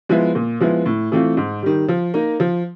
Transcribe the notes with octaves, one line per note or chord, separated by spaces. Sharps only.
F3 G#3 B3 E4
A#2
F3 G#3 B3 E4
A2
E3 A3 C4 F4
G#2
D#3 G3
F3
A#3 D#4
F3